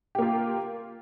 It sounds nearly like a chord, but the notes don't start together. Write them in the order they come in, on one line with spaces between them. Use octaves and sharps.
G4 A#3 F4